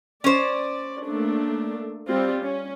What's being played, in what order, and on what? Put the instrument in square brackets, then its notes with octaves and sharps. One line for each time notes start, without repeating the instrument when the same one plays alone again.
[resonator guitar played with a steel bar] C#4 C5 [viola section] D5
[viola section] A3 A#3 D4
G3 C4 F4
C#4